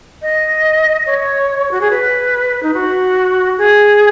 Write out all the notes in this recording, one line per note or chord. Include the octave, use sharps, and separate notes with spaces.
D#5
C#5
F#4
G#4
B4
D#4
F#4
G#4